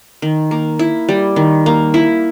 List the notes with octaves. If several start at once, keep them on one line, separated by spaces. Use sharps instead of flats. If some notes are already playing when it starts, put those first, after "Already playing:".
D#3
A#3
E4
G3
D#3
A#3
E4